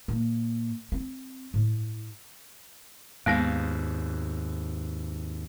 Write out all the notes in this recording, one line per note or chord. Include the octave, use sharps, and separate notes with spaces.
A#2
C4
A2
D#2 G#2 G#3 B3 F5